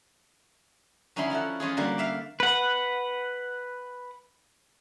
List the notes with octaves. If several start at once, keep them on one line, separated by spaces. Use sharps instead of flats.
D3 C#4 D#4 E4 B5 C6
F3 E4 A4 F#5
G#3 C#4 F4 G#4
D3 G3 A#3 F#4
D5 E5 F5
B4 F#5